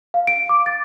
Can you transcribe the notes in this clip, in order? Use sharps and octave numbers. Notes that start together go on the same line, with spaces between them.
F5
D7
D6
A6